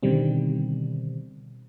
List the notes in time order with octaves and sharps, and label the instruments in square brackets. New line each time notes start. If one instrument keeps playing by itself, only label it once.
[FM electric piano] B2 D3 D#3 G3 C4